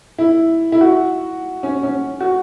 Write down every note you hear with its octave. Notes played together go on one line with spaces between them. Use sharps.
E4
E4
F#4
C#4
C#4
F#4